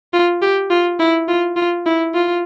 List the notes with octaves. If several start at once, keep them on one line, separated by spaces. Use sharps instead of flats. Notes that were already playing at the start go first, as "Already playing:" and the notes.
F4
G4
F4
E4
F4
F4
E4
F4